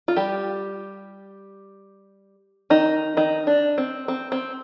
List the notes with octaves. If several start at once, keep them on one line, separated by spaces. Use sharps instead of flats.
F4
G3 G4
D#3 D#4
D#3 D#4
D4
C4
C4
C4